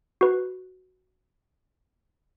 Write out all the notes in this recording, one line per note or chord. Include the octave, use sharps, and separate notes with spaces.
F#4 B4